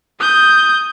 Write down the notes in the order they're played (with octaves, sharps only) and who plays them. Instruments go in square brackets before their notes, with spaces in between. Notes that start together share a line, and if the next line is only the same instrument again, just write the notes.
[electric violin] D#6 G6